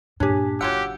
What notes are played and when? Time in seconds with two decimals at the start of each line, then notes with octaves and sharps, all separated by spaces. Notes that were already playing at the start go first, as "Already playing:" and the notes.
0.20 G2 A#2 C#4 D4 G4 G#4
0.61 F#1 F#3 F4 G4 F#5 E6